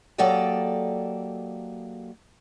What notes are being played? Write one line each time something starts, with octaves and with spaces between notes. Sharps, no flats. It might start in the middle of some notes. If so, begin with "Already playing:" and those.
F#3 A#3 G4 A4 D5 D#5